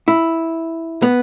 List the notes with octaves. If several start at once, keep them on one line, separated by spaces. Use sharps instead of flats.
E4
B3